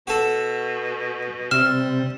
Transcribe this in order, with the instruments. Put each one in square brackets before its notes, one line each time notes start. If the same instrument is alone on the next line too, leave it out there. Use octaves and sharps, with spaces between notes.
[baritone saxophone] B2 [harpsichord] F#4 A4
[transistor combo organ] C3 [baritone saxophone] G3 [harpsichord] E5 [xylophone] F6